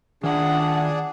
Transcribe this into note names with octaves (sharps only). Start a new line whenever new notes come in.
D#3 D4 F4 G#4 F#5